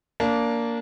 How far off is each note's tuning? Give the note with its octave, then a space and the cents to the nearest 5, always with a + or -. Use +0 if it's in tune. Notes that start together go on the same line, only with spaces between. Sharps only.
A#3 -5 D4 -20